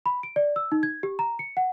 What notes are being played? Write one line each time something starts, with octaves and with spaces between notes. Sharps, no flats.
B5
D7
D5
E6
D#4
G#6
G4
A#5
C#7
F#5